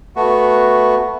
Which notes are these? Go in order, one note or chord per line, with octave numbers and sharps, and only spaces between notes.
A3 B3 F#4